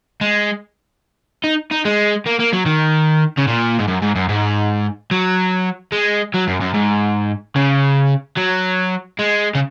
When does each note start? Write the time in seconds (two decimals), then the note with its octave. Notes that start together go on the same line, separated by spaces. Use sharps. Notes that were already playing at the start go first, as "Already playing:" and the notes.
0.21 G#3
1.44 D#4
1.71 D#4
1.85 G#3
2.26 A#3
2.39 A#3
2.53 F#3
2.66 D#3
3.38 C#3
3.48 A#2
3.79 G#2
3.88 F#2
4.02 G#2
4.16 F#2
4.29 G#2
5.11 F#3
5.92 G#3
6.34 F#3
6.47 F#2
6.60 F#2
6.74 G#2
7.56 C#3
8.37 F#3
9.19 G#3
9.55 C#3